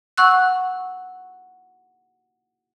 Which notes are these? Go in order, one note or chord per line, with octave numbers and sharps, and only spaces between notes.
F#5 C#6 E6 F#6